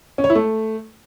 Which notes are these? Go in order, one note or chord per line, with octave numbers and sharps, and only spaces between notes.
C#4
C#5
E4
A3